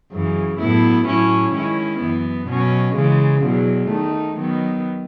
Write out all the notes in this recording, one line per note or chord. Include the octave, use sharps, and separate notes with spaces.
F#2 C#3 E3
A2 F#3 B3 E4
A2 F#3 C#4 E4
D#3 G#3 C#4 E4
F#2 E3 B3
B2 F#3 C#4
C#3 E3 G#3
E2 B2 F#3
D#3 A3 D#4
D#3 F#3 B3